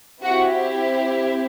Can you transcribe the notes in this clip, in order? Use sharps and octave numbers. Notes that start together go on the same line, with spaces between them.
C4 E4 F#4 G4 F#5